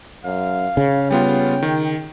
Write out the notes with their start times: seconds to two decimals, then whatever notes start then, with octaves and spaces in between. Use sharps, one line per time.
0.25 F#2 F5
0.77 C#3 C#4
1.11 G3 B3 F4 G5
1.63 D#3